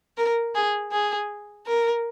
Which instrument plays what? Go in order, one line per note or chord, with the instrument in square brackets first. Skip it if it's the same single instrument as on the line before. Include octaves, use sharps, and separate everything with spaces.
[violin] A#4
G#4
G#4
A#4